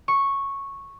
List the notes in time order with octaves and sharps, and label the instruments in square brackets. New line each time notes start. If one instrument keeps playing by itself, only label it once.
[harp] C#6